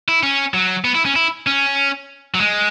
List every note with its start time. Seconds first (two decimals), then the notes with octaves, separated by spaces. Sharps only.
0.08 E4
0.23 C#4
0.54 F#3
0.84 B3
0.95 E4
1.06 C#4
1.16 E4
1.47 C#4
2.35 F#3
2.40 G#3